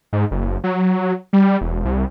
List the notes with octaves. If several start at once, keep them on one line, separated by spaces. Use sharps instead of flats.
G#2
F#1
F#3
G3
E1
C2